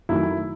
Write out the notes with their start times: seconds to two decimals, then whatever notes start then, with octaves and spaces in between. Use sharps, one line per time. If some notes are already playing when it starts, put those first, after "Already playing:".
0.09 F#2 D#3 F#3 A3 E4